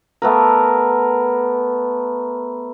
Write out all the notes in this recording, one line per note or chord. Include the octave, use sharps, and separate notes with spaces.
A3 B3 A#4